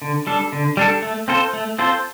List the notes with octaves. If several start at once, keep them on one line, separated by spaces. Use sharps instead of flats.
D3
G3 D4 A4
D3
G3 D4 A4
A3
C4 F4 A4 C5
A3
C4 F4 A4 C5